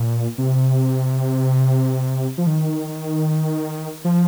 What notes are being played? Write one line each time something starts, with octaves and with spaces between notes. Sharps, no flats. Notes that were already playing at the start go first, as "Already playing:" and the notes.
Already playing: A#2
C3
F3
D#3
F3